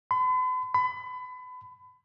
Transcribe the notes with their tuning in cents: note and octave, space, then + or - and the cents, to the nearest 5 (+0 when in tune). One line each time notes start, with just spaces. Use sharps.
B5 +45
B5 +30